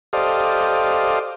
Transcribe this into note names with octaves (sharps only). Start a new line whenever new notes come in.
G4 A4 C5 D5 D#5 F5